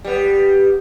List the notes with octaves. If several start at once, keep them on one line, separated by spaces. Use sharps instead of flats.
G3 B3